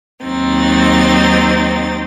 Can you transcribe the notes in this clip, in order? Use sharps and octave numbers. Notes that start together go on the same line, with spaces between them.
D#2 F#3 C4 D#4 A6